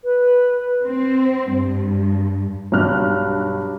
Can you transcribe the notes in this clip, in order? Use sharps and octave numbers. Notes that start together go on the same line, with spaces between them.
B4
C4
G2
B1 G2 F6 F#6